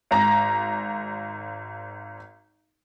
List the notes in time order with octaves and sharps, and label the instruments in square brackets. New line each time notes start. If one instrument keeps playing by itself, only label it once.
[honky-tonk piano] G#1 A#5 A#6